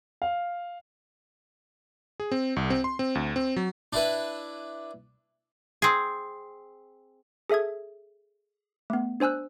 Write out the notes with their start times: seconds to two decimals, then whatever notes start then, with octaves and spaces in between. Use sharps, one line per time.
0.22 F5
2.20 G#4
2.32 C4
2.56 C2
2.70 C4
2.84 C6
2.99 C4
3.15 D2
3.36 C4
3.56 F#3
3.93 D4 E4 B4
5.82 C4 G#4
7.50 G#4 A4 E5 D#6 G#6
8.90 A3 B3
9.20 D4 C5 G#5 E6 F#6